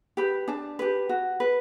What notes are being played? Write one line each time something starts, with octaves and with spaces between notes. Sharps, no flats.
G4 B4
D4 A5
G4 B4
F#4
B4